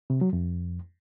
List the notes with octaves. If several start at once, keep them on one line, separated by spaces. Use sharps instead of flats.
C3
F#3
F2